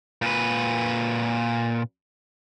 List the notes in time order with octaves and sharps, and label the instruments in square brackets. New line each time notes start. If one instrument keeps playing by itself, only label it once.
[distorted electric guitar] A#2 B4